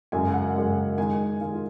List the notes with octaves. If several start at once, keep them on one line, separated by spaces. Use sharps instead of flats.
F#2 C#3 G#3 G#5
G#5
F#5
F#2 C#3 G#3
D#3 G#3 D#4 G#5
D#3 G#3 D#4 F5
F4